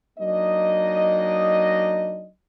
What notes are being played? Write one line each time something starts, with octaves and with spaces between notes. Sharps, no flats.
F#3 A#3 D4 D#4 D#5